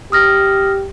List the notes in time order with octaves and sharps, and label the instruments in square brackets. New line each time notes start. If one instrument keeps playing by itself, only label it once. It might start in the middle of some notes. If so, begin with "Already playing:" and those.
[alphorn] G4 [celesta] D#6 F6 A#6